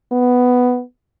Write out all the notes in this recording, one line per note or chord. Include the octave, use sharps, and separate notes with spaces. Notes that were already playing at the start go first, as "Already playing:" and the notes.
B3